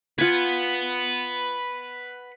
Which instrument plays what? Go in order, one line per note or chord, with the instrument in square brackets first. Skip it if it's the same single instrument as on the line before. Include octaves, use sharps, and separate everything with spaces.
[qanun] F4 G#5 [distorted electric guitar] B4 F#5